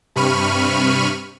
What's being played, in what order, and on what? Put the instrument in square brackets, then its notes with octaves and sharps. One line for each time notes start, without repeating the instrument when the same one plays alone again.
[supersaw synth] G2 C3 B5 C#6 F6 D#7